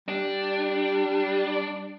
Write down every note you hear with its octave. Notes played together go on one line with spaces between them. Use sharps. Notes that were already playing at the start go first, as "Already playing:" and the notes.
G3 D4